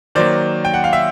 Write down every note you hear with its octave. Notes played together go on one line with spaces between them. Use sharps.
D#3 F#3 A#3 C5 D5
G5
F#5
F5
E5